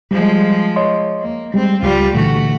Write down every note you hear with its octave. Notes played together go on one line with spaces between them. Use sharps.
F3 G3 G#3
C#5 D#5 C6
A#3
G3 G#3 C4
C#2 G3 F4
A#2 D3 E3 A3 F#4